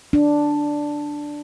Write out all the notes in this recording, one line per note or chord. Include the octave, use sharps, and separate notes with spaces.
D4